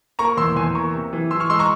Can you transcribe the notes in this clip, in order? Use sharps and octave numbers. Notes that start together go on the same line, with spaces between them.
A#3 A#5 C#6
E2 C6 E6
E2 G#5 C6
A#3 A#5 C#6
C3
E3
E3 C6 E6
C#6 F6
G#3 C6 E6
A#5 C#6